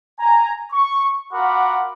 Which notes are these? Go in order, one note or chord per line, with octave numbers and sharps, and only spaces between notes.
G#5 A#5
C#6
F4 F#4 A#4 F#5 B5 D6